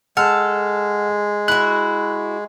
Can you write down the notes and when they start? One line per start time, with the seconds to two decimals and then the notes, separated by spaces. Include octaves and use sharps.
0.17 G#3 A4 F#5 F6
1.48 E4 F#4 F#6